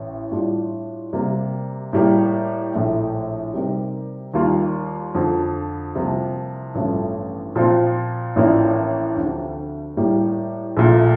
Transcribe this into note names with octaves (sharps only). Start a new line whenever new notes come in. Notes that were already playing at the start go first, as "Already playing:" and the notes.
Already playing: A1 A2
A2 G3 D4 F4
C3 G3 A#3
A2 G3 A#3
A#1 A2 A3
C3 G3 C4 D#4 A#4
D#2 D#3 G3 A#3 F4
F2 D3 F3
C2 C3 F3 A#3
A1 G2 F3 A3
A#2 F3 C4 F4
A1 A2 F3 A#3 D4
D2 D3 F3 C4 G4
A2 G3 A#3
A#1 A#2 A3